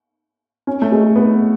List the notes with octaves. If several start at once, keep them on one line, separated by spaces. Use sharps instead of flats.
C#4
A3
G#3
B3